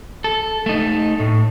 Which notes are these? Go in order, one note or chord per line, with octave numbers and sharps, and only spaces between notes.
A4
A3 D#4
A2